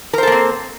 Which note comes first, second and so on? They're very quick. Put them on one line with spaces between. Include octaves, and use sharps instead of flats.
A#4 C5 A4 A#3 C4